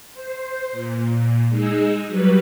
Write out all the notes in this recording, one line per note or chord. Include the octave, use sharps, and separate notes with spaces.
C5
A#2
G#3 D#4 G#4 E6
F#3 G3 B4